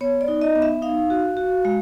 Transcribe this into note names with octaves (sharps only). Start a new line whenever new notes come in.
B3 C#5
D5
D#4
D#5
B3
E5
D#4 F5
F#4
F#4
G#3